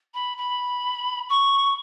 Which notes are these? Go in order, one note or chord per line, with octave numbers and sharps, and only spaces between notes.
B5
B5
C#6